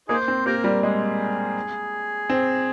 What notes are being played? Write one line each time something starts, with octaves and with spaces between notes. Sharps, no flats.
A#3 D#4 G#4 C5
C4
A#3 G4 A#4
G3
G#3 G#4
C4